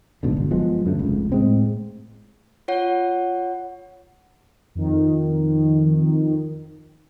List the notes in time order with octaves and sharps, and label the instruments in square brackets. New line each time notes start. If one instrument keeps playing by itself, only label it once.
[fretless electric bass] A#1 G#2 B2 D3
G1
F3 F#3 G#3 B3
F#2 D3 A3
F1 C#2
A2 G#3 C4
[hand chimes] F4 C#5 F#5
[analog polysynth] F2 D#3